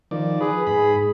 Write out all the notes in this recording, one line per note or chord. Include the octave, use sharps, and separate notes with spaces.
D#3 F3 D5
G#4 B4
G#2 B5